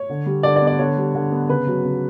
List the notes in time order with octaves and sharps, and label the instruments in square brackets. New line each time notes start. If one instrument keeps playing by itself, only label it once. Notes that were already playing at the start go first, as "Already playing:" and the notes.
Already playing: [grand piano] C#5
D3
G3
D3 D5
D5
B3
D5
D3 C#5
G3
D3
B3
C#3 B4
F#3
C#3